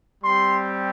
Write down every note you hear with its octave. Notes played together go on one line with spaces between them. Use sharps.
G3 C4 G4 C6